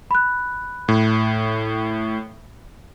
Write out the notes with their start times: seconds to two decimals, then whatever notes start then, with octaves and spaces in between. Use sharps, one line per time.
0.11 B5 F#6
0.88 A2